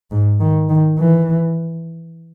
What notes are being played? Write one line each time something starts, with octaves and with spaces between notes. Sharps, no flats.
G#2
D#3
D#3
E3